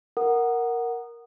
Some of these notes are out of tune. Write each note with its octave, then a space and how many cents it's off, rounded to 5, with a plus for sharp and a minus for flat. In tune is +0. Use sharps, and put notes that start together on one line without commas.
A#4 +0 F#5 +0 D#6 -20